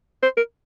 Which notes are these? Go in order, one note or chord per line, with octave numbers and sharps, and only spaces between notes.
C5
A#4